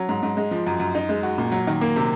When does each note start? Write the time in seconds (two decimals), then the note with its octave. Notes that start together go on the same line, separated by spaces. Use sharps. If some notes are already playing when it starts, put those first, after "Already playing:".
Already playing: F#3 C#4
0.09 G#2
0.23 G#2
0.37 G#3
0.51 F3
0.67 F#2
0.80 F#2
0.95 D#4
1.09 G#3
1.23 F#4
1.38 A#2
1.52 F#3
1.67 D#3
1.81 A#3
1.96 C3